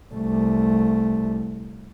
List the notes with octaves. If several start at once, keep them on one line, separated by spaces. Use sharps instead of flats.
C2 A3